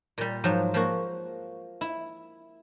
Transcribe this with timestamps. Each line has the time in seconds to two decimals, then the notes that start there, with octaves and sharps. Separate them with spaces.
0.18 A#2 G3
0.44 G#2 F3 F#3
0.74 F3 A#3 F#4
1.81 E4